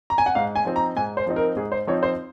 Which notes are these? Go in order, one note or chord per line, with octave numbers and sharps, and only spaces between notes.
A#5
G#5
F#5
G#2 F5
G#5
F3 C4 D#4
A#5
G#2 G#5
C5
F3 C4 D#4
A#4
G#2 G#4
C5
F3 C4 D#4 C#5
C5